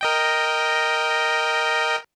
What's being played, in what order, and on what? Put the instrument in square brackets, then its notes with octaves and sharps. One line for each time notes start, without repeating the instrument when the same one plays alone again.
[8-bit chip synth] A#4 D#5 G5